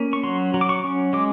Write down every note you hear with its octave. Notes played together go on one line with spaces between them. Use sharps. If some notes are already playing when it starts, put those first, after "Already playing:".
Already playing: A#3 C#4
C#6
F#3 C6
F#3
D6
C#6
C#4
G#3 D6